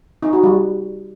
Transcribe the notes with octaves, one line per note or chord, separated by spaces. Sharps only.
D#4
F#4
G3